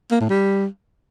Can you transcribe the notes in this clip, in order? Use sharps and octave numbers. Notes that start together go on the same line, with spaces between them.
A#3
A2
G3